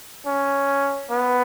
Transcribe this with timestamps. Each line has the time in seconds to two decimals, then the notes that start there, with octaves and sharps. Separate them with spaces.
0.26 C#4
1.11 B3